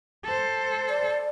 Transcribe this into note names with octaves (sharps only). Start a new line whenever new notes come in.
A4 C5
D5